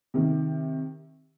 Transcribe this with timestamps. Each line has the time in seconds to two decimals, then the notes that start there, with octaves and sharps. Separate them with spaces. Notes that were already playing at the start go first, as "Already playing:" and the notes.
0.14 C3 D#3